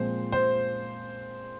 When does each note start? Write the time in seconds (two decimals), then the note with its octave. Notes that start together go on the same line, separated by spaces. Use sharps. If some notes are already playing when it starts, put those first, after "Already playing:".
Already playing: A#2 F3 G#3 C4 C5
0.32 C5